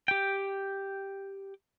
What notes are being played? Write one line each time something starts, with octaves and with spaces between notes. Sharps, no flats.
G4 G5